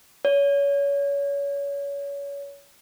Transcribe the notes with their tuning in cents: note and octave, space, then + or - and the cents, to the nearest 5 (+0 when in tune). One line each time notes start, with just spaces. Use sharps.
C#5 +30